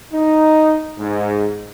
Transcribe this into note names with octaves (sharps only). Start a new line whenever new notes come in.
D#4
G#2